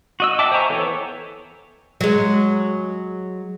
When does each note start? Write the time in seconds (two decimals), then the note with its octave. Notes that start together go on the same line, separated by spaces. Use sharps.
0.20 F#4 D#5 E6
0.39 D#5 E5 G5 A5 D6
0.52 C5 G5 G#5 A#5 C#6
0.69 E3 B3 A4 C#5
2.01 F#3 G#3